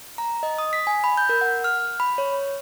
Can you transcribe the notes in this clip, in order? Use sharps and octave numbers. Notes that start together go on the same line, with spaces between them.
A#5
D#5
D#6
B6
G#5
B5
G6
A#4
F#5
F6
B5
C#5